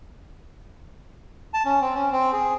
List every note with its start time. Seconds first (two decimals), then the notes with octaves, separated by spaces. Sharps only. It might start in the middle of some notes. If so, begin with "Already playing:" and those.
1.54 A5
1.65 C#4
1.81 C4
1.95 C#4
2.12 C4
2.33 G#4